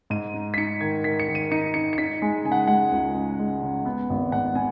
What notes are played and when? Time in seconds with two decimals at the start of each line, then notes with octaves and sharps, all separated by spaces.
0.10 G#2 D#7
0.34 D#4
0.54 B6
0.57 D#4 C#7
0.81 D#3 G#6
1.04 D#3 B6
1.20 C#7
1.28 D#3
1.35 D#7
1.51 D#4 C#7
1.74 D#4 C#7
1.93 C#7
1.98 D#4 B6
2.22 G#3 G#5
2.44 C#3 G#5
2.52 F#5
2.67 G#3 F#5
2.92 C#2
3.15 C#3
3.39 G#3
3.63 C#3
3.86 B3
4.10 G#1
4.32 G#2 F#5
4.55 B3 G#5